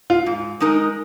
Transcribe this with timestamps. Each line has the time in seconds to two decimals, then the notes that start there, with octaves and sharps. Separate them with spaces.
0.10 F4
0.26 G#2
0.60 G#3 D#4 A#4